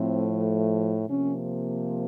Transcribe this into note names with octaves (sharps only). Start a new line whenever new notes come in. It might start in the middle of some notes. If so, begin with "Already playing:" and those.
Already playing: A2 F3 A3 C4
C3 F3 A#3 C#4